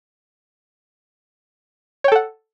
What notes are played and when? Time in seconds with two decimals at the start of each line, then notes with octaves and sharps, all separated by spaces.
2.04 C#5
2.08 G5
2.12 A4
2.15 F#5